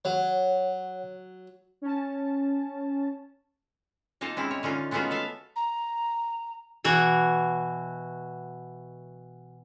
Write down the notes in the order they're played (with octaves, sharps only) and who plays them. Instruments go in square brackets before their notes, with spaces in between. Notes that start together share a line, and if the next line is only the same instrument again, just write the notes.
[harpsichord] F#3 [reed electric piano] C#5 F#5
[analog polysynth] C#4 A5
[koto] A#3 D#4 F4 A4
G#3 C4 C#4 E4
C#5
D3 C#4 D#4 F4
G#3 A3 B3 C#4 F4 F#4
A4 E5 F5
[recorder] A#5
[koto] B2 E3 F#4